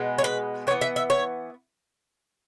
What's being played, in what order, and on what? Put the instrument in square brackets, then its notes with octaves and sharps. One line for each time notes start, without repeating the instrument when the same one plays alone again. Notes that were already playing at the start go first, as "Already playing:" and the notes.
Already playing: [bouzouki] B2 G#3 B3
C#5
B4
E3 C#5
B3
E5
E5
C#5